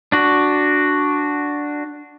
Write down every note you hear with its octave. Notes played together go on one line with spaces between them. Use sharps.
D4 F#4